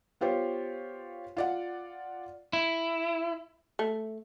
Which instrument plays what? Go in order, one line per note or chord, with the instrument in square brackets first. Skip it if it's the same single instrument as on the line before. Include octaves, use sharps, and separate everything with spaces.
[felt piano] B3 F4 G4 C5 C#5
F4 D5 F#5
[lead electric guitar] E4
[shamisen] A3